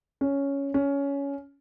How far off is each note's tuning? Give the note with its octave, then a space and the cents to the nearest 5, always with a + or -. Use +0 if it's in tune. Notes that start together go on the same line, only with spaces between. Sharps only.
C#4 +5
C#4 +15